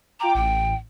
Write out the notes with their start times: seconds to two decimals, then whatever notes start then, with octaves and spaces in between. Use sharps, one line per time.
0.20 F4 G5 A#5 D6
0.35 A1 G5